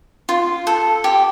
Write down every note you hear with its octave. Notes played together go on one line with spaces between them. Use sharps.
F4
A4
G4